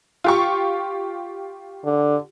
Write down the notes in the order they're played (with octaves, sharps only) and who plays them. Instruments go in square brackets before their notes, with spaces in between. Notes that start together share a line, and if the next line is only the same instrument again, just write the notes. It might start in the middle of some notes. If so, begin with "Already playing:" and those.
[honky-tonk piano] F4 G4 C#6
[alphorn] D3